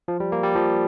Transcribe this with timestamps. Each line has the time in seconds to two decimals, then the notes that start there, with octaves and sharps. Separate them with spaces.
0.08 F3
0.20 G3
0.32 A#3
0.43 G3
0.55 F3